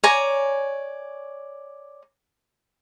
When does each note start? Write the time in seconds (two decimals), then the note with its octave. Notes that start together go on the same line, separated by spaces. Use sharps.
0.04 C#5 D5 G#5 A#5